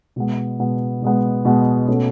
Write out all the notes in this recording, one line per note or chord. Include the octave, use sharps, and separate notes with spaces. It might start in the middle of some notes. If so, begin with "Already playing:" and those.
B2 G#3 B3
B2 G#3 B3
B2 G#3 B3
B2 G#3 B3
B2 A3 C#4